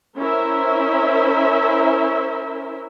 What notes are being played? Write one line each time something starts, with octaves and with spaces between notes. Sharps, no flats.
C#4 E4 A#4 C5 E5